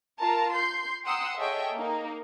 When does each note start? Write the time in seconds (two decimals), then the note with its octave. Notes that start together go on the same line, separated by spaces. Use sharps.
0.21 F4 A#4 A5 A#5
0.54 C6 G6 C7
1.06 F#5 G5 A#5 C6 D#6 E6
1.37 G#4 A4 C#5 D#5 E5 G5
1.76 A#3 D#4